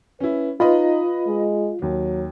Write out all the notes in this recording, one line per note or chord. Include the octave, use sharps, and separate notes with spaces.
C#4 E4 B4
D#4 F4 B4 D#5 B5
G#3
D#2 F#3